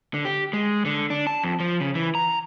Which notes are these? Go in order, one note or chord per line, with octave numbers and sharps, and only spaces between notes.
D3
G4
G#3
D3
D4
A5
F2
F3
C#3
E3
A#5